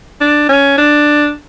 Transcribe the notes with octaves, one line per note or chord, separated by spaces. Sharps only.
D4
C#4
D4